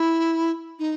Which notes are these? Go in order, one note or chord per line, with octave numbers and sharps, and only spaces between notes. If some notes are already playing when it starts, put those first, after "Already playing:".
Already playing: E4
D#4